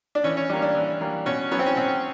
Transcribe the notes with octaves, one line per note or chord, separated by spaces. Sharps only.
D4
E3 C#4
C#4
G3 A#3 D4
D4
E3
G3 A#3
B2 C#4
F#3 B3 C#4
C4
C#4
B2 C4